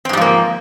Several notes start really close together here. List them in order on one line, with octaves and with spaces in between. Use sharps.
C4 G#2 G3 F3 A#3